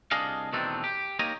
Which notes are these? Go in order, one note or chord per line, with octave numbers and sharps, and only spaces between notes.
C2 D4 G#4 D#5 F5
E2 B2 D#3 A3 C4 D4
G4
A#3 D#4 G4 C#5 D#5